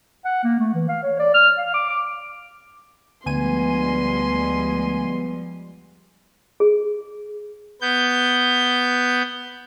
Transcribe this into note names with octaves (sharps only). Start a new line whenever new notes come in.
F#5
A#3
A3
E3
F5
C#5
D5
F6
F5
D6
D6
D2 F3 G3 G#3 B3 G#5 C6 D#7
G#4
B3 G6